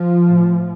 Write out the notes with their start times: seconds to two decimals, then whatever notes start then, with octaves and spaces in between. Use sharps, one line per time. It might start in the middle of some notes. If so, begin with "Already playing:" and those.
Already playing: F3
0.24 A2